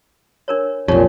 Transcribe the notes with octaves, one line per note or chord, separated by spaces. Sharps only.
D4 A#4 C#5
B1 F2 A#2 D#4 G4 C#5